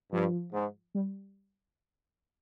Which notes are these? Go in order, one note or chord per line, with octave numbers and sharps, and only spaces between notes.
G2 F3
G#2
G3